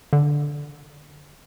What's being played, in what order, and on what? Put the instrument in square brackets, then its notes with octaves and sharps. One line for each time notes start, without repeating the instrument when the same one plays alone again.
[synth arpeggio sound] D3